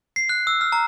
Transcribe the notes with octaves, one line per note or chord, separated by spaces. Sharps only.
C7
F#6
E6
F6
A#5